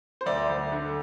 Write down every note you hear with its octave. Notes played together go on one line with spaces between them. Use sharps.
C5
D2 D5
D2
D3